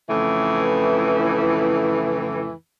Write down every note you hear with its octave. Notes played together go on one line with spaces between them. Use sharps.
F2 A2 C#3 E3